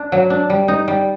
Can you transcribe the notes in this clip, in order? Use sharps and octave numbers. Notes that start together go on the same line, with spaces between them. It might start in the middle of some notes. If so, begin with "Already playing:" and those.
Already playing: D4
F#3
D4
G3
D#4
G3